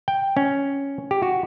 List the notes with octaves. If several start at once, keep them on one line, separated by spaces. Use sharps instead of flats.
G5
C#4
G4
F#4